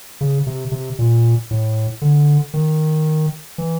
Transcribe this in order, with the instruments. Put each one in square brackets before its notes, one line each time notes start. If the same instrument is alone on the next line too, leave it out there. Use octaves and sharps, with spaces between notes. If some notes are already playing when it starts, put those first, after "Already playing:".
[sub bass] C#3
C3
C3
A#2
A2
D3
D#3
E3